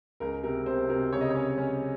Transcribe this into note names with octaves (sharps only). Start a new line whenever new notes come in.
C#2 A#4
C3 A#4
C3 C5
C3 A#4
C#3 C#5
D#5
C#4 C#5
C#4